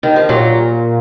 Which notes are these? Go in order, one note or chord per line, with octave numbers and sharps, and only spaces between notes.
D#3
F3
A#2 F#3